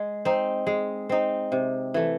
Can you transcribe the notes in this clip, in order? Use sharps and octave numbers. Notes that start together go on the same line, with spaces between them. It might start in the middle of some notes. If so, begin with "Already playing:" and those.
Already playing: G#3
C4 D#4
G#3
C4 D#4
C3
E3 A3